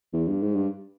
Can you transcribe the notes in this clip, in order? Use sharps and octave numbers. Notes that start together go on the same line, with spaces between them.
E2
G2
G#2
G2